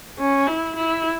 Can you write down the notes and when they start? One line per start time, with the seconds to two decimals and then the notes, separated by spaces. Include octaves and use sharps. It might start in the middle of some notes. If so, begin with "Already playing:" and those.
0.19 C#4
0.47 E4
0.76 E4